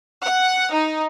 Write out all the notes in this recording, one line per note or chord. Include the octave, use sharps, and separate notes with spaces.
F#5
D#4